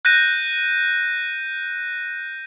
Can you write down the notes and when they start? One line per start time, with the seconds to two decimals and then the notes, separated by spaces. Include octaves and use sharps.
0.05 F#6 G6 A#6 D#7